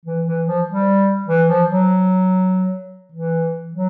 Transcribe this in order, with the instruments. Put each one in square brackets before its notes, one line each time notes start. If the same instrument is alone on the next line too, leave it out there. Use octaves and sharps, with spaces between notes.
[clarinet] E3
E3
F3
G3
E3
F3
F#3
E3
F#3